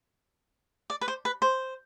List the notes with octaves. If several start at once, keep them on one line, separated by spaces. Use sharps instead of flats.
D5
B4
C5
B4
C5